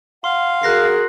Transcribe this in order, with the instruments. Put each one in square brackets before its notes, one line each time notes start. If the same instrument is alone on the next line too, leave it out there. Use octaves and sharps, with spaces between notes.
[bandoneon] F5 [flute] F#5 [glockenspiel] C6
[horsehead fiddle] F#4 A#4 [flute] G#4 [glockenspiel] F#6 A#6 C7